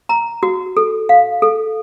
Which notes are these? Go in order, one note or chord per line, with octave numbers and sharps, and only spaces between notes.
A#5
F#4
A4
F5
A4